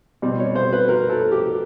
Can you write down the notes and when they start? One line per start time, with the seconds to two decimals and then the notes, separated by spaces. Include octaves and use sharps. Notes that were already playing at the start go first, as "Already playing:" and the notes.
0.22 B2 G3 C4
0.40 C#5
0.55 C5
0.73 B4
0.89 A#4
1.10 A4
1.32 G4